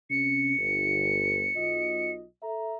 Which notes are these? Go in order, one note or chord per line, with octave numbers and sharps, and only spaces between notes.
C3 C#4 C#7
G1
B1 F4 D#5
A4 E5 A#5